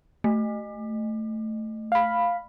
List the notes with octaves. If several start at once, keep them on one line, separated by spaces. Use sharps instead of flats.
A3
F5 B5